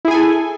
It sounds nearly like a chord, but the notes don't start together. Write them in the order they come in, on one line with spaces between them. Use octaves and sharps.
E4 G#4 G#5 A4